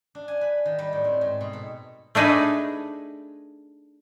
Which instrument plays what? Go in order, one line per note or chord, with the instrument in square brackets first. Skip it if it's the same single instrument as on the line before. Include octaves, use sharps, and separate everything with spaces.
[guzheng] D4
G#5
B4
D#3
G3
A2
C4
G#2
B2
A4
[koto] A3 D4 D#4 G#4 B4